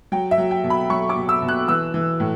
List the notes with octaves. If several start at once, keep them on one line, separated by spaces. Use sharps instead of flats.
F#3 G5
E5
F#3
G5
B2
B5
F#3 C#6
D6
B2
E6
B2
F#6
E3 E6
E3
A2